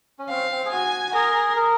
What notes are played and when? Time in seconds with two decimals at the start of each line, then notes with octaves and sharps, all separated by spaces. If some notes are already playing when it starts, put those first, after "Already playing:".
0.19 C#4
0.29 C4 F5
0.51 C4
0.66 G#4
0.72 F#4 G#5
1.14 G#4 A#4
1.57 A#4